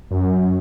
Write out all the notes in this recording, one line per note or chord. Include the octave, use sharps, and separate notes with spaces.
F#2